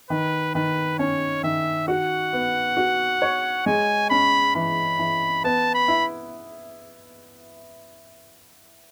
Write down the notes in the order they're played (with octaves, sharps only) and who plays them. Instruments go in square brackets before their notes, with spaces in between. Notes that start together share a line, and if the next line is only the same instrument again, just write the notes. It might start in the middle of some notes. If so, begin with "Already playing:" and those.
[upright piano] D#3 [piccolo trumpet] B4
[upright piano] D#3 [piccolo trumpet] B4
[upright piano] C#4 [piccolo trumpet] C#5
[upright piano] D#3 [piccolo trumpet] E5
[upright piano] F#4 [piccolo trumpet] F#5
[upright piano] B3
F#4
C#5
[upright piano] G#3 [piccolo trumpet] G#5
[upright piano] C#4 [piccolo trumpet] B5
[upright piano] E3 [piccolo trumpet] B5
[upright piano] E3
[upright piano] B3 [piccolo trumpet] A5
[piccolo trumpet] B5
[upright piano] E4